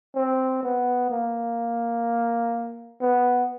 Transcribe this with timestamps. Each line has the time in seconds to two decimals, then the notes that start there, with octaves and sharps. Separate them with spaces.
0.16 C4
0.63 B3
1.10 A#3
3.01 B3